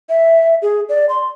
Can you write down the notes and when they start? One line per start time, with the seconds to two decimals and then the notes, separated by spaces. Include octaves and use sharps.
0.09 E5
0.62 G#4
0.89 D5
1.09 C6